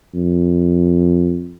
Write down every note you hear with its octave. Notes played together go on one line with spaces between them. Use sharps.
F2